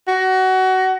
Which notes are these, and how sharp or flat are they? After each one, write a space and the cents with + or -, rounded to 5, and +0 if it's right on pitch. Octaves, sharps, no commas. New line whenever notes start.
F#4 +25